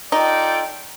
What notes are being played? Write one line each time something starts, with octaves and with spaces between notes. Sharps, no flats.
D#4 F4 A4 D5 G5